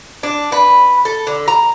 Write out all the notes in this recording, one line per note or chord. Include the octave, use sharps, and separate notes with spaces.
D4
B4
A4
D3
A#5